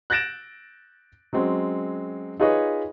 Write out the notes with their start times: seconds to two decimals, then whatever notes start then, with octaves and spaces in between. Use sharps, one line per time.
0.10 F#6 G6 A6 A#6 D7 E7
1.33 F#3 G#3 C4 C#4
2.40 D#4 F4 G#4 B4 C#5 D#5